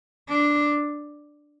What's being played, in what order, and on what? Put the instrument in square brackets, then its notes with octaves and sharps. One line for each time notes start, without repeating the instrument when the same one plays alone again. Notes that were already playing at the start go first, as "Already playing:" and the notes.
[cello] D4